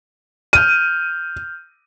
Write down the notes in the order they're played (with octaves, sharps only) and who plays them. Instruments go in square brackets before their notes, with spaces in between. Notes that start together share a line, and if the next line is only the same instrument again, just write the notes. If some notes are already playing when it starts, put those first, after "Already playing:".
[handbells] F6 G6 [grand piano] D#7